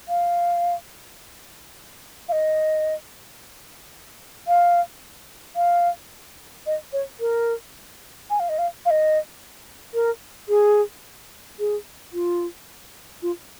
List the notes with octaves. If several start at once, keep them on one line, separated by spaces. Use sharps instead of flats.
F5
F5
D#5
F5
F5
D#5
C#5
A#4
G#5
F5
D#5
F5
F5
D#5
A#4
G#4
G#4
F4
F4